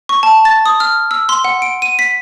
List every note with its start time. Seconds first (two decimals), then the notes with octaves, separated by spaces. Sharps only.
0.09 C#6
0.23 A5
0.45 A6
0.66 D#6
0.80 F6
1.11 E6
1.29 C6
1.44 F#5
1.62 D7
1.82 D#7
1.99 B6